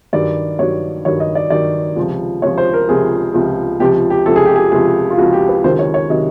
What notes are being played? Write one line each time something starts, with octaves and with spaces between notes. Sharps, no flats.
G2 D#3 F#3 D5
G2 D#3 F#3 C#5
G2 D#3 F#3 C#5
D#5
D5
G2 D#3 F#3 D5
C#2 C3 F3
C#2 C3 F3 C#5
C5
A#4
C#2 C3 F3 G#4
C#2 C3 F3
C#2 C3 F3 G4
G4
C#2 C3 F3 A4
G#4
G4
G#4
C#2 C3 F3 G#4
F4
C#2 C3 F3 F#4
G4
B4
C#2 C3 D#3 F#3 C5
C#5
C#5
C3 D#3 F#3 D#5